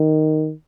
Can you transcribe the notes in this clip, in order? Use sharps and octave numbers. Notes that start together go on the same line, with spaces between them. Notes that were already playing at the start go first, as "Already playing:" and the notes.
Already playing: D#3